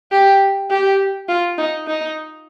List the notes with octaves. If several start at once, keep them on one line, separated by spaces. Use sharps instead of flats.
G4
G4
F4
D#4
D#4